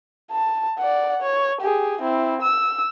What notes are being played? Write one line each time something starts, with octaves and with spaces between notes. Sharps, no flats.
A5
D5 F#5
C#5
G4 G#4
C4 E4
E6